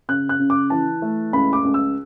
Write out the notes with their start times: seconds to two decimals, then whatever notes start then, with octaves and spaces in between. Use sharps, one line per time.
0.09 C#3 F#6
0.29 F#6
0.39 C#3
0.50 D6
0.70 E3 A5
1.02 A3
1.33 C#2 B5
1.53 D6
1.64 C#2
1.74 E6